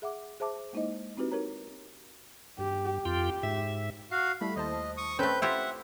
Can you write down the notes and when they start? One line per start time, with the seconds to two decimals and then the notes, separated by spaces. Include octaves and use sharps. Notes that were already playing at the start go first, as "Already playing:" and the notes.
0.02 G#4 E5 F#5 D6
0.40 G#4 C5 E5 A5 D6
0.73 G#3 A#3 D#4 E4 C5 D#5
1.17 C4 D#4 E4 F#4 G4 B4
1.32 D#4 G4 A#4 B4 C#5 A#5
2.58 G2 G4
3.05 F2 F4 G4 G5
3.43 G#2 E5
4.11 F#4 F5 C7
4.41 G3 A3 E4 B5
4.56 D#2 C5 D#5 A5
4.97 C#6 D#6
5.19 A3 C4 C#4 A4 B4 G5 G6
5.42 E4 F4 G4 E5 F#5 C6